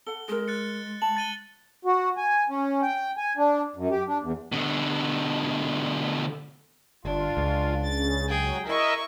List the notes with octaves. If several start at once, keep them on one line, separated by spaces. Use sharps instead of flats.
A4 F#5 G7
G#3 G#4 A#4
F#6 A6 C#7
A5 F#7
A6 D#7 G7
F#4
G#5
C#4
G5
G#5
D4
F#2
G4
D4
E2
B2 D3
G1 D4 F4
C#2
C#3 A6
F#3 G#4 G5
E4 A#4 D#5 E5 C#6